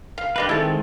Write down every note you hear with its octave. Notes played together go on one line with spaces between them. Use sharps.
F5
D4 G4 B4 D#5 F5
D#3 G#3 C4 E4 A4